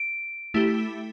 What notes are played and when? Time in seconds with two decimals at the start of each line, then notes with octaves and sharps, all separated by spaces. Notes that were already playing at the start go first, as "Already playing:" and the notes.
Already playing: D7
0.54 A3 E4 G4